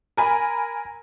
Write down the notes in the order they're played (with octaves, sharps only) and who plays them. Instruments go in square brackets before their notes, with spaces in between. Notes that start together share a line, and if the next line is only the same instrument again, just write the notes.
[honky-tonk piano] A#4 G#5 B5